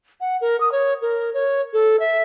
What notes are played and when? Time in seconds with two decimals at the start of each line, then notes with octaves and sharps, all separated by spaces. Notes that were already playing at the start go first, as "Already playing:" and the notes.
0.20 F#5
0.41 A#4
0.60 D#6
0.72 C#5
1.01 A#4
1.34 C#5
1.73 A4
1.99 E5